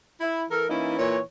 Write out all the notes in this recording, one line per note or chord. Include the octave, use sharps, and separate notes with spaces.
E4
E3 A4 A#4
E3 A#3 C#4 D#4 E4
A#2 E3 C#5